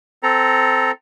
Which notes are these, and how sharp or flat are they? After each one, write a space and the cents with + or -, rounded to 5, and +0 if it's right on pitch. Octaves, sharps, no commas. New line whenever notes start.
C4 -15 A4 +0 A#5 +0